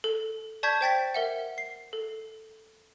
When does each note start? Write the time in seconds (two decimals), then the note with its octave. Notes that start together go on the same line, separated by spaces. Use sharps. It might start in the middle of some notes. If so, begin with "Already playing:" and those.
0.04 A4
0.63 D5 A5 C#6 G6 G#6 B6
0.81 C5 G5 A6 B6
1.14 A#4 E5 F#5
1.58 C7
1.93 A4